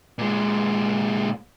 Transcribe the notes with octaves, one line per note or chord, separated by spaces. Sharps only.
A#2 G#3